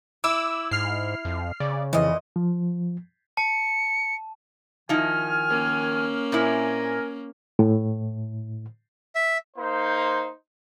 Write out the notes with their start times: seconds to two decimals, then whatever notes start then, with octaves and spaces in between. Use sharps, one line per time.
0.24 E4 D6 E6
0.71 G#2 F6 C7
1.25 F2
1.60 C#3 D5
1.93 F2 A#2 E3 D#5
2.36 F3
3.37 A5 C#7
4.89 D#3 F3 D#4 E4 G#5 F6
5.50 A#3 C#4
6.32 A#2 C4 E4 A#4 G#5
7.59 A2
9.15 E5
9.57 A#3 D#4 C5